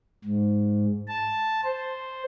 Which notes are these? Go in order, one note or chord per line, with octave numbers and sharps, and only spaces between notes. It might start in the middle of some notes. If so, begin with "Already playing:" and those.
G#2
A5
C5